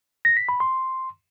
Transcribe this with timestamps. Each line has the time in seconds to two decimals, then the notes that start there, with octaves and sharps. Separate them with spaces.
0.25 A#6
0.37 B6
0.49 B5
0.60 C6